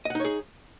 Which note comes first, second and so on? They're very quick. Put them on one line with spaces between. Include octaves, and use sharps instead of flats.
D#5 F#5 D#4 C#5 G#4